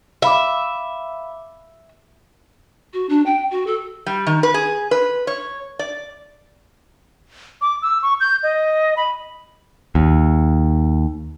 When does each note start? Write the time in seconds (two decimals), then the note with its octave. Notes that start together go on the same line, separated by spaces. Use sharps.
0.22 E5 F5 B5 D6
2.93 F#4
3.09 D4
3.26 G5
3.51 F#4
3.66 A4
4.06 G3
4.27 D#3
4.43 B4
4.54 G#4
4.91 B4
5.27 C#5
5.79 D5
7.62 D6
7.82 E6
8.02 C#6
8.20 G6
8.43 D#5
8.97 B5
9.95 D#2